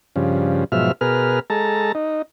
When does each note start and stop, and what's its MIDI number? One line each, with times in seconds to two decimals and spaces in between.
0.16 0.64 43
0.16 0.64 49
0.16 0.64 53
0.72 0.92 44
0.72 0.92 47
0.72 0.92 53
0.72 0.92 54
0.72 0.92 76
0.72 0.92 89
1.01 1.40 47
1.01 1.40 68
1.01 1.40 70
1.01 1.40 71
1.01 1.40 89
1.50 1.92 56
1.50 1.92 69
1.50 1.92 81
1.50 1.92 82
1.95 2.22 63